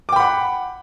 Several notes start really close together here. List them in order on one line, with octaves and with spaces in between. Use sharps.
D6 G5 B5 F#5